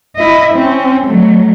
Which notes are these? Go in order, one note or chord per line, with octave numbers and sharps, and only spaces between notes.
E4 D#5
C4 C#4
F#3 A3